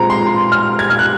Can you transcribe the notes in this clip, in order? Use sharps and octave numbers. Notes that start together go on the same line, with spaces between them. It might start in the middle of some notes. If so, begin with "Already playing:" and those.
Already playing: A#2 G#3 C4 A#5
C6
F6
G#6
F6
F#6